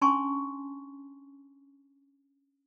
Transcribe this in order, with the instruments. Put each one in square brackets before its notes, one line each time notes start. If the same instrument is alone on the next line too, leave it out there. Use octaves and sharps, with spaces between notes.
[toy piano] C#4 D4 G#5 A5 C6 C#6